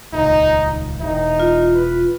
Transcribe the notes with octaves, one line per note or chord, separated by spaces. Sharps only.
D#1 C#2 D#4
E1 A#1 E3 D#4
F4
B4